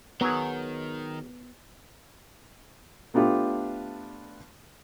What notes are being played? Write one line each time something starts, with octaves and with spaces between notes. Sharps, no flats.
D#3 F#3 B3 G#4
A3 B3 D4 F4 G4